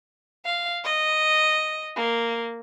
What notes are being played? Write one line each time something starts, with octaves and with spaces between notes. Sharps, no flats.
F5
D#5
A#3